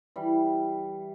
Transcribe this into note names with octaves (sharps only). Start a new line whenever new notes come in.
E3 G3